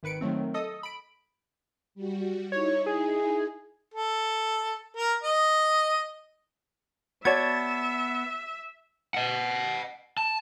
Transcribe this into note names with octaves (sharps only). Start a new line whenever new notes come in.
G#1 D#3 B4 C#7 D7
D#3 F#3 A3 C4
A4 D#5 D#6
B5 D7
G3 F#4
D#4 E4 C#5
G#4
A4
A#4
D#5
B3 F#4 C#5 D5 E5 A5 G#6
D#5 F#5
A5